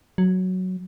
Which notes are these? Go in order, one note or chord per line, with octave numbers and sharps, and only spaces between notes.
F#3